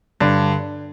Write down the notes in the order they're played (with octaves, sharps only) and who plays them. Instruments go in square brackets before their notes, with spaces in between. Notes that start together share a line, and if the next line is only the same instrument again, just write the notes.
[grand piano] G2 [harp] D3